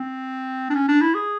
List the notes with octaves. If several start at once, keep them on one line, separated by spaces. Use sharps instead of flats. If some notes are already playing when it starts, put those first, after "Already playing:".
Already playing: C4
D4
C#4
D4
E4
G#4